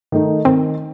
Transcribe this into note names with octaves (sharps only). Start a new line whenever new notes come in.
D#3 A3 D#4
D#3 C4